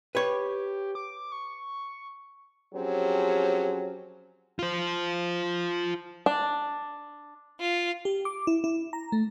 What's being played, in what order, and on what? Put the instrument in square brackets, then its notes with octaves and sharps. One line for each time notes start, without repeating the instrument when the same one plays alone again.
[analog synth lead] G4 [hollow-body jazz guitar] B4 C#5
[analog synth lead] D6
C#6
[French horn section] F3 F#3 C4 C#4 G4 G#4
[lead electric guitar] F4 C5
[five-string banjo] D4
[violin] F4
[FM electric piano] G4
D6
E4
E4
A#5
A3